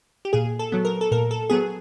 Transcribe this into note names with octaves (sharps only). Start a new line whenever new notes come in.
G4
A#2 G#4
A4
F#3 B3
A#4
A4
A#2 A#4
A4
F#3 B3 G#4